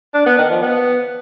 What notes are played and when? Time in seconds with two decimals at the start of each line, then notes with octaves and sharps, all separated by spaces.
0.14 D4
0.26 B3
0.38 D#3
0.50 F3
0.62 B3